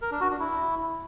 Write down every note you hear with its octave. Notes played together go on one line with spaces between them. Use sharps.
A#4
D4
F#4
D4
E4